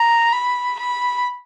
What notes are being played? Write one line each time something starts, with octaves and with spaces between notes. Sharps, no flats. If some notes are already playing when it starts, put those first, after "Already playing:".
Already playing: A#5
B5
B5